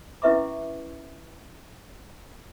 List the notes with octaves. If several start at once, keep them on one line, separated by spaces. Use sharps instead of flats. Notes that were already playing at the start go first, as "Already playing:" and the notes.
C#4 E4 B4 E5 C#6 D6